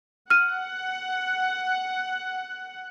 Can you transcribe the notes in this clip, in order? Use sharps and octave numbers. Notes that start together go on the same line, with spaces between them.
F#5 F6 D#7